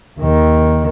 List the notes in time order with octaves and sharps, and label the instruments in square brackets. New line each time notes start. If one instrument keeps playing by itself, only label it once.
[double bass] D#2 D#3